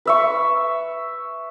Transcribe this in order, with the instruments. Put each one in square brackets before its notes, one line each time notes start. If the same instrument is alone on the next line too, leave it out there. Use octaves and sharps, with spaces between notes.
[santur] B4 E5 C#6